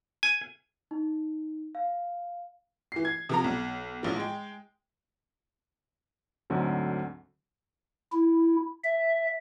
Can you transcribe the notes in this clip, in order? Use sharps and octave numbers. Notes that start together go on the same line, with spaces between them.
G#5
D#4
F5
E3 C7
G#6
C3 F3 A#5
B1
A1 F3
G#3 G5
D2 G#2 D3 F#3 C4
E4
E5